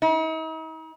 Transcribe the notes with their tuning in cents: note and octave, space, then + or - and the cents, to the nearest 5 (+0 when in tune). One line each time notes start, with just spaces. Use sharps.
D#4 +45